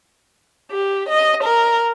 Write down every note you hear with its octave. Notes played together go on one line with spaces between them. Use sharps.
G4
D#5
A#4